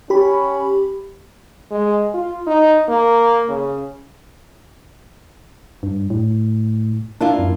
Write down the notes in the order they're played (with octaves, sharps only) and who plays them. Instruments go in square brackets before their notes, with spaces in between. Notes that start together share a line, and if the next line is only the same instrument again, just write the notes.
[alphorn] C#4 [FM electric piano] G4 B5
[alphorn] G#3
F4
D#4
A#3
C#3
[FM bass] G2
A2
[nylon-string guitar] A#3 E4 F4 [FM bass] D4
[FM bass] F#2